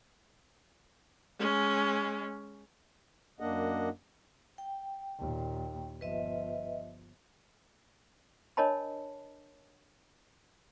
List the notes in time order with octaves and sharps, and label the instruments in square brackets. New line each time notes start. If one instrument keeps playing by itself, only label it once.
[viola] G#3 C#4
[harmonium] F#2 A#3 D4 D#5 F#5
[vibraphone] G5
[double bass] D#2 A#2
[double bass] G1 F3 [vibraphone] B4 D#5 E5
[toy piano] D4 A#4 C#5 D#5 A5 B5